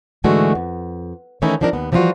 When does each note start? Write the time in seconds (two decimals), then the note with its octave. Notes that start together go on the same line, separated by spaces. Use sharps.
0.24 G#2 D3 E3 G#3 A3 F#4
0.55 F2
1.42 D#3 E3 A3 C#4 D#4 E4
1.61 F3 C4 D4 D#4 A#4
1.73 D#2 B3
1.92 E3 F3 G3 D#4 F4 F#4